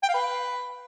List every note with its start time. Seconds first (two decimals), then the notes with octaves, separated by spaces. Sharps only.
0.03 G5
0.09 F5
0.14 B4